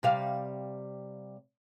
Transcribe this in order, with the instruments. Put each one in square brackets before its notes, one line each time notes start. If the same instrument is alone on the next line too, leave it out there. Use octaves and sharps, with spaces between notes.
[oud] C3 G3 F5